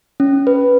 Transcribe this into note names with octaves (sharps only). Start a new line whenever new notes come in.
C#4
B4